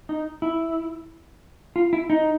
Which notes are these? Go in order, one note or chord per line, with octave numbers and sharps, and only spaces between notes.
D#4
E4
F4
E4
D#4